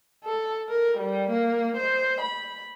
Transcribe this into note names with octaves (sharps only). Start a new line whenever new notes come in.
A4
A#4
G3
A#3
C5
B5